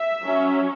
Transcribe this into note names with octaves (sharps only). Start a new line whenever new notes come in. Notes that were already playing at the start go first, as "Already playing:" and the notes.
Already playing: E5
F#3 C#4